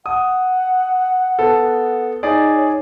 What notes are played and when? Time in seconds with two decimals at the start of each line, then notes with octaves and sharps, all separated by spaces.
0.06 F#5 D#6
1.39 B3 A4
2.23 D#4 G#4 C#5 D5